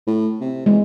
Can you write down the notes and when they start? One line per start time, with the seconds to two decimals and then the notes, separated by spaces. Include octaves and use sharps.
0.07 A2
0.41 C3
0.66 E2 G#3